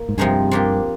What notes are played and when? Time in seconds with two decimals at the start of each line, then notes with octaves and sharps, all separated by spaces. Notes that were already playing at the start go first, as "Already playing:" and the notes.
Already playing: A#3
0.09 G#2
0.17 G2 C3 F3 G#3 D#4 G#4
0.51 F3 A#3 D4 G4